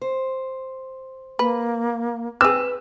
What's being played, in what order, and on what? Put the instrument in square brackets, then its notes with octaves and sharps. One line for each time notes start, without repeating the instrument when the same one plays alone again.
[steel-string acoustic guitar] C5
[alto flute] A#3 [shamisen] B4
[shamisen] C4 G#4 [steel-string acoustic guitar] B4 [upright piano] E6